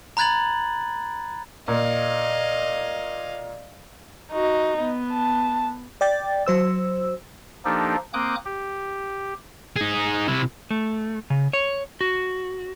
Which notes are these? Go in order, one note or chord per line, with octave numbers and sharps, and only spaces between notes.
A#5 B5 F#6 G#6 A6 F#7
A#2 D#5 F5
D#4 F#4
B3
A5
D5 G5 A6
F#3 C5 E6
F3 A#3 D4 D#4 G4 A4
A#3 C4 D6 D#6 F#6 G6
G4
D#4 G#4
C3 E4
A3
C#3
C#5
F#4